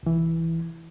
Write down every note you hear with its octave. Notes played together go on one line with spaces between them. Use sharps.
C2 E3